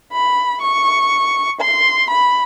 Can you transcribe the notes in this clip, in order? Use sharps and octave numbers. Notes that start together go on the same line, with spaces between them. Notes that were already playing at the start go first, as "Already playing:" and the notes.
B5
C#6
C6
B5